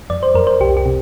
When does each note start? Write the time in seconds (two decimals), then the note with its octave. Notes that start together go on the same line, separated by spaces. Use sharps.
0.10 F2 D5
0.23 C5
0.34 F2 A#4
0.47 C5
0.60 C2 G4
0.77 G4
0.85 C3